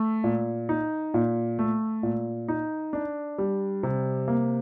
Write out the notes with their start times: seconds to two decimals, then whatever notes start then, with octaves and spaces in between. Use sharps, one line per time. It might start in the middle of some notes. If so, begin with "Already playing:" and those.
Already playing: A3
0.24 A#2
0.69 D#4
1.14 A#2
1.59 A3
2.03 A#2
2.48 D#4
2.93 D4
3.38 G3
3.83 C3
4.28 A#3